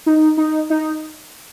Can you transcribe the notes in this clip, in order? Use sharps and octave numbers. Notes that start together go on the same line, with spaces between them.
D#4
D#4
D#4